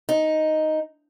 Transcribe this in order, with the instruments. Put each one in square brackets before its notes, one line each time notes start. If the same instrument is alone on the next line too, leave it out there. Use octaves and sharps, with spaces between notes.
[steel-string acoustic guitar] D#4